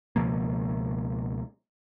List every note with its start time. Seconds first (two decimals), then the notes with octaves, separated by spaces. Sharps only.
0.16 C#2 B2 F3 A#3